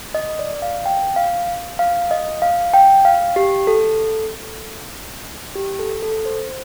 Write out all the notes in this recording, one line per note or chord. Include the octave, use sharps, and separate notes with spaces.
D#5
D5
F5
G5
F5
F5
D#5
F5
G5
F5
G4
A4
G4
A4
A4
C5